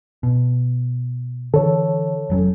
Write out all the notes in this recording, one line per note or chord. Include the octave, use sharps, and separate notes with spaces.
B2
D3 E3 A4 C#5
F1 F#3 C#4